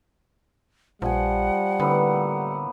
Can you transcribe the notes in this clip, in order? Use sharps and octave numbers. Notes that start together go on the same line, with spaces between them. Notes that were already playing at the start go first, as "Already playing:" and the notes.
A#1 F3 G3 F#5 G#5
A2 D3 A#3 B3